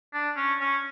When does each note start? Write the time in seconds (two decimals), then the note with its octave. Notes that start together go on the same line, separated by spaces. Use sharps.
0.14 D4
0.36 C#4
0.60 C#4